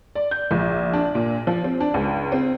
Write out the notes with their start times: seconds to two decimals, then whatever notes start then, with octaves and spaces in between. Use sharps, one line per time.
0.15 D5
0.31 G6
0.51 A#1
0.93 D4
1.15 A#2
1.47 F3
1.64 C4
1.80 D4
1.94 C#2
2.32 C4